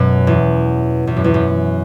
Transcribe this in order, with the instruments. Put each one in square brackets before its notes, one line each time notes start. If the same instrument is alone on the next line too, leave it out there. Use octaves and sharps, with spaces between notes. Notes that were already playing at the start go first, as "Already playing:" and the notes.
Already playing: [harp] F#2 B2
E2
E2
F#2
E2
F#2